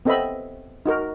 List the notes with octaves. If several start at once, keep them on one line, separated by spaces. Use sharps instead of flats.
B3 C4 A4 D#5 E5 B5
D#4 F#4 A#4